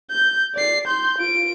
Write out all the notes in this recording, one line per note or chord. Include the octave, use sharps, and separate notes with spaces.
G6
D5 C7
C6 G6
F4 D7